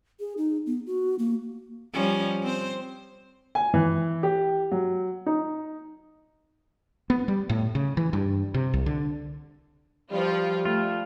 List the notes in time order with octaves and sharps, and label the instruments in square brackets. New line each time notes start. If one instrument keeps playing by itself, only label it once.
[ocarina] G#4
D#4
B3
F#4
A#3
[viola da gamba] F3 G3 C#4
C4 C5
[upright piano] G#5
E3
G4
F#3
D#4
[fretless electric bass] B3
G3
A2
C#3
E3
G2
C3
C2
D3
[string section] F3 F4 [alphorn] G3
[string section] A3 [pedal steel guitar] F4